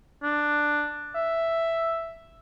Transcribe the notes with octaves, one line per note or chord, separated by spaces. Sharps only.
D4
E5